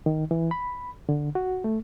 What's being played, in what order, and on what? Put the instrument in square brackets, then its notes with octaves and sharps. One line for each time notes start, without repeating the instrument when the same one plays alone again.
[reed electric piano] D#3
E3
B5
D3
F#4
A3